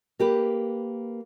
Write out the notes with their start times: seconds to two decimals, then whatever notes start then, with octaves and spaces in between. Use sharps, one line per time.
0.19 A#3 G4 B4